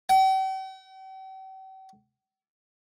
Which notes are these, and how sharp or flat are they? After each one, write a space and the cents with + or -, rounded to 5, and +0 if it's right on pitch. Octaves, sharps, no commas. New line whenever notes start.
G5 -45